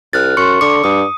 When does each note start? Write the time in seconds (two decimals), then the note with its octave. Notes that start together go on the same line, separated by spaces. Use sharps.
0.13 C2 F6 F#6 A6
0.37 F#2 C6 C#6 C#7
0.61 D3 D6 C#7
0.84 G2 D#6